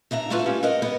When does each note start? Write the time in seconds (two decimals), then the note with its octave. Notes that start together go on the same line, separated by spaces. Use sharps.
0.11 D#2 D4 E5 A#5
0.30 A3 D4 F4 F#4 B4 E5
0.46 A#3 C#4 G4
0.63 A#4 B4 D#5 F#5
0.82 B3